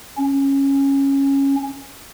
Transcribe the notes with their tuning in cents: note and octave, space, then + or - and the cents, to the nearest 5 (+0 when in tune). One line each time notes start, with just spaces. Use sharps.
C#4 -10